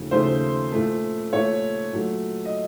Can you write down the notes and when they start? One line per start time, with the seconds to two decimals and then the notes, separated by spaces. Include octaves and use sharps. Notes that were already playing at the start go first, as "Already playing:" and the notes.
Already playing: D#2 C#3 F3 A3
0.11 D#2 C#3 F3 A3 C5
0.72 A#2 A3
1.33 A#2 A3 C#5
1.93 A#2 F#3 A3
2.46 D#5